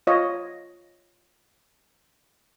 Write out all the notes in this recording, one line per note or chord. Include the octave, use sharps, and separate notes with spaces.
F4 C#5 D#5